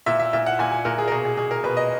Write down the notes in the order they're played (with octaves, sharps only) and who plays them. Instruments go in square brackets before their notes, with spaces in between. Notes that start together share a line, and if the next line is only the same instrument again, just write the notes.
[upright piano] A#2 E5
E5
A#2 E5
F#5
A#2 G#5
G#5
A#2 A#4
G#4
A#4
B2 G#4
G#4
B2 G#4
A#4
B2 B4
D#5